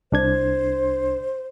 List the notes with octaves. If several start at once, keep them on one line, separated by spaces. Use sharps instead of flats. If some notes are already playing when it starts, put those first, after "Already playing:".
C2 D4 C5 G#6